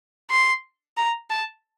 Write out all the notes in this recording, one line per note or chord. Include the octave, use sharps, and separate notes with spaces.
C6
A#5
A5